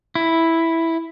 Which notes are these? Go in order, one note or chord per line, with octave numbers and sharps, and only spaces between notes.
E4